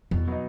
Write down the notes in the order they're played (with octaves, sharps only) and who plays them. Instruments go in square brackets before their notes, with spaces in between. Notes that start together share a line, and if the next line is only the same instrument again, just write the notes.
[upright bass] E2 [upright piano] B2
[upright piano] F#3 B3 D#4